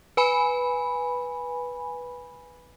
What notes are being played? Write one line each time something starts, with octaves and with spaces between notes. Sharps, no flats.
B4 G#5 B5